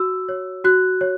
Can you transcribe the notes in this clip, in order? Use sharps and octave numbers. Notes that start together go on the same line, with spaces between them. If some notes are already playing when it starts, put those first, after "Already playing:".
Already playing: F#4 E6
C#5
F#4 F#6
C#5